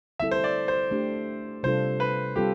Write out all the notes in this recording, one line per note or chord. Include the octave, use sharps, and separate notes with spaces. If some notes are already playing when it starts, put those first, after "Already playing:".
D3 G3 C4 E4 A4 E5
C5
D5
C5
A3 D4 G4
C3 G3 D4 F4 A4 C5
B4
G3 C4 F4 G4 A4